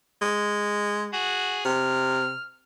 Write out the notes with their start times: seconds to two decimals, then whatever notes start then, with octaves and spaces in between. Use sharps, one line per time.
0.21 G#3
1.13 F#4 G#4
1.65 C3 F6